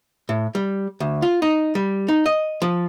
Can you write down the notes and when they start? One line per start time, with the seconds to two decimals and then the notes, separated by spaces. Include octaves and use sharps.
0.29 A2
0.55 G3
1.00 D2
1.22 F4
1.42 D#4
1.75 G3
2.08 D#4
2.26 D#5
2.62 F3